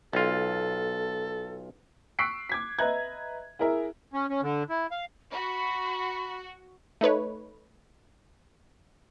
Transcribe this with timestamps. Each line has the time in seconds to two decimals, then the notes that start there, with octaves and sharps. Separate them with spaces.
0.13 B1 F4 A4
2.19 C#6 E6 F#6 B6 C7 D7
2.49 D6 G#6 B6
2.79 B4 D#5 E5 A#5 F#6 G#6
3.59 E4 G#4 A#4 E5
4.13 C#4
4.29 C#4
4.42 D3
4.70 E4
4.91 F5
5.32 F#4 B5
7.01 A3 D#4 B4 C#5